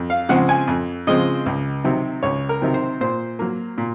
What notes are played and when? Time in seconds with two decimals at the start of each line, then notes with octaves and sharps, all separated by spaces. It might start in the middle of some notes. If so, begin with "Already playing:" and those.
Already playing: F2
0.10 F5
0.29 C#3 F3 G#3 C4 F#5
0.49 G#5
0.68 F2
1.07 C#3 F3 G#3 C4 D#5
1.46 C#2
1.84 C3 D#3 F#3 C4
2.23 C#2 C#5
2.49 A#4
2.62 C3 D#3 F#3 C4
2.74 C5
3.01 A#2 C5
3.39 F#3 A#3
3.78 A#2